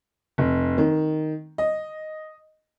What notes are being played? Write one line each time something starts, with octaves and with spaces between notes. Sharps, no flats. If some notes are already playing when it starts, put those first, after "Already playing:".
F1
D#3
D#5